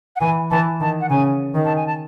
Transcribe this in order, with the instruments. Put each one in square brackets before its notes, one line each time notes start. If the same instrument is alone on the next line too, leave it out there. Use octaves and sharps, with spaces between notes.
[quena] F#5
[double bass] E3 [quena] G#5
[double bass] E3 [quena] A5
[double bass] D#3 [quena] A5
[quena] F#5
[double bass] C#3 [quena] G#5
[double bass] D#3
[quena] A5
G#5
A5